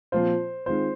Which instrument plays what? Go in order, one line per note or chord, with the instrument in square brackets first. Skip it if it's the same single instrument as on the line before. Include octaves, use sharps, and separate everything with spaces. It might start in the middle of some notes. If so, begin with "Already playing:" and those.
[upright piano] A#2 F3 C4 F4 [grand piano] C5
[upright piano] D#3 G#3 C4 F4 [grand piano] C5